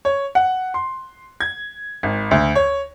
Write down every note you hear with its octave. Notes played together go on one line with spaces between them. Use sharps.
C#5
F#5
C6
G#6
G#1
D2
C#5